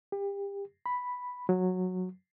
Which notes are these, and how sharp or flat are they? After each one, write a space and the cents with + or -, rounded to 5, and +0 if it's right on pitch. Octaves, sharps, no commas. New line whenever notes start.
G4 +30
B5 +0
F#3 -10